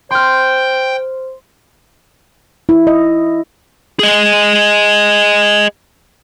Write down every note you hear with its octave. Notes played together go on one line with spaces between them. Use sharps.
C5 G5 C6 F6
E4
D#5
G#4 D#5